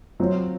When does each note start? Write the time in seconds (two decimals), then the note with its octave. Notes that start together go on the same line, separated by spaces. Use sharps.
0.20 F#3 C4 F4